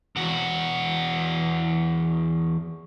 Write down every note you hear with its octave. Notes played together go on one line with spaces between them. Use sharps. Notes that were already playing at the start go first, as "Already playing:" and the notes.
E2 F#4